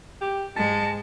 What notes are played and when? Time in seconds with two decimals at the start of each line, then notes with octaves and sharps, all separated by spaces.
0.21 G4
0.56 G#2 G#3 A5